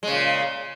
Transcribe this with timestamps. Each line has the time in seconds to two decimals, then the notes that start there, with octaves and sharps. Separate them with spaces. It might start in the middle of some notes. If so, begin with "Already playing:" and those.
0.03 G#3
0.08 C#3
0.12 A#2